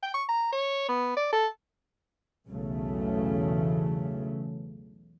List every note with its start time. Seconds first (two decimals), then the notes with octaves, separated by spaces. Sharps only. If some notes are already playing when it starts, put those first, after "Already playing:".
0.03 G5
0.14 C#6
0.29 A#5
0.53 C#5
0.89 B3
1.17 D5
1.33 A4
2.48 B1 E2 C#3 F#3 A3